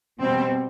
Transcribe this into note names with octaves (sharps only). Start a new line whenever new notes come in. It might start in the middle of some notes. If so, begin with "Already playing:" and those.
B2 G3 C4